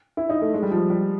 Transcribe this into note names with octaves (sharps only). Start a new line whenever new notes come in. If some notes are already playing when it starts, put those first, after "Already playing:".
E4
D#4
A3
G#3
G3
F3
G3